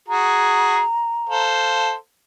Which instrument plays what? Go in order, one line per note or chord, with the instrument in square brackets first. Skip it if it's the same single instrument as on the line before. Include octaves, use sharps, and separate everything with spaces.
[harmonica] F#4 G#4 [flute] A#5
[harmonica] A4 C5 F5